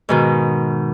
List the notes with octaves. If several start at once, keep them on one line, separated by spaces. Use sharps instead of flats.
G#2 B2 D#3